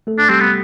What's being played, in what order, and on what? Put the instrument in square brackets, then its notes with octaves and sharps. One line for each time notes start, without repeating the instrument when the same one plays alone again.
[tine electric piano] A3 A4
[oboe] D4
[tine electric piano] G3 G4 [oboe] C4
[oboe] B3